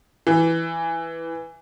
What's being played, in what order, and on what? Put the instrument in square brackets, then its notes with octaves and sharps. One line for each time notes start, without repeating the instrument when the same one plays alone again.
[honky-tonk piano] E3